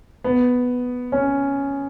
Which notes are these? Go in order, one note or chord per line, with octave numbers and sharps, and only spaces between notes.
B3
C#4